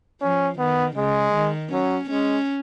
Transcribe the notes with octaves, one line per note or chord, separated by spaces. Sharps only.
F3 C#4
D#3 B3
C#3 G#3
D#3
F#3 C#4
G#3 C#4